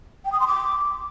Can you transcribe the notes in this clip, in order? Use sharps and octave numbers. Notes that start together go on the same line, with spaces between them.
G5
D#6
C6
D6